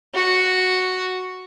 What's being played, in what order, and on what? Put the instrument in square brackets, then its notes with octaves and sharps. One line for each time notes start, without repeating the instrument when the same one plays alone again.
[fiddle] F#4